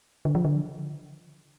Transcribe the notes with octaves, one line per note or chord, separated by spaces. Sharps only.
D3
F3
D3